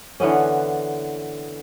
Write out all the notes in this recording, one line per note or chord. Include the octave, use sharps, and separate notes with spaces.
D3 E3 B3 C#4